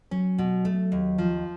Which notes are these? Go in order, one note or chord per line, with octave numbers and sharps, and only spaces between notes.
F#3 C#4
B2
A3
D#2
F3